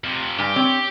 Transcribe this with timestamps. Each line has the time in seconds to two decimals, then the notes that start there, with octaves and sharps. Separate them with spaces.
0.04 F2 C3
0.39 G2 G4 G#5
0.56 C4 C#5